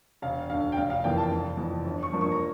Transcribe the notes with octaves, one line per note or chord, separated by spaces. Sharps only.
E1 F5
D2 D3 F5
G5
F1 F5
F5
F2 E3 A#3 G5
A5
F1
F2 E3
G1
C#6
G2 F3 A#3
C#6
A#5